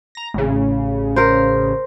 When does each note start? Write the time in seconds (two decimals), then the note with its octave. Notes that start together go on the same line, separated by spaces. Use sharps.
0.15 A#5 A#6
0.34 A1 C#3
1.16 A#4 C5